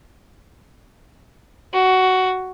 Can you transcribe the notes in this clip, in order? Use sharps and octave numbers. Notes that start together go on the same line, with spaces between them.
F#4